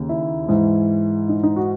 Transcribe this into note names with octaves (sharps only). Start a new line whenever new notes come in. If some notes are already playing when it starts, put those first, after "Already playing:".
Already playing: D#2 C#3
E4
G#2 E3
D#4
D#4
F#4